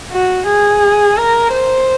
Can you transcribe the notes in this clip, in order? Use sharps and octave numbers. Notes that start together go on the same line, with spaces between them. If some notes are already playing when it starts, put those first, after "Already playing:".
F#4
G#4
A#4
C5